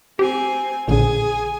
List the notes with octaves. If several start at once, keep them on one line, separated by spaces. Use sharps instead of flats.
C4 G4 G#5
A#1 D3 G#4 G#5